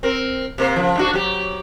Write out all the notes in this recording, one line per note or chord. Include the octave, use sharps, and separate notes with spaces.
C4 A#4
C3 A#3 C5
C#3 F3
G#2 D4 F#4
F#3 G4